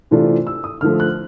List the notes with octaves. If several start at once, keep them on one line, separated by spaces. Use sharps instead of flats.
C3 E3 A3 D4 F4
E6
D#6
D3 F3 A3 F6
F#6